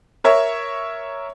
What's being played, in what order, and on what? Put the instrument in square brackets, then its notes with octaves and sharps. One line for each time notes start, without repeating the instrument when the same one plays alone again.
[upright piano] A#4 C#5 E5